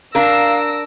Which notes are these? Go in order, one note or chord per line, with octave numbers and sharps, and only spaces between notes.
D4 A#4 F5 E6 A#6